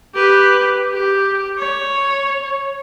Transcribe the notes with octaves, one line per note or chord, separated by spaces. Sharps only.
G4 B4
G4
C#5